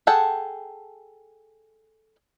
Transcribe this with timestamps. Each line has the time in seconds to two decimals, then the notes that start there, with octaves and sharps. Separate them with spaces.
0.07 G#4 A4 F#5 G5 A5